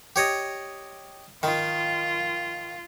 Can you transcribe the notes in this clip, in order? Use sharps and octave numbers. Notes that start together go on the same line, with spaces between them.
G4 C#5 D#5
D#3 F4